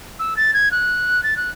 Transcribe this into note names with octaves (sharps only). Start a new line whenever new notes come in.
E6
A6
G#6
F#6
A6
F#6